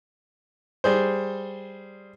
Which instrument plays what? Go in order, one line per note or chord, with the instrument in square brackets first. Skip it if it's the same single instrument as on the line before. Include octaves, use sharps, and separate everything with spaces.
[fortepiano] G3 G#4 C5